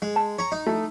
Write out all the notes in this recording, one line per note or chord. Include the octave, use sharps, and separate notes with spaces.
G#3
A5
C#5 A#5
D#4
A3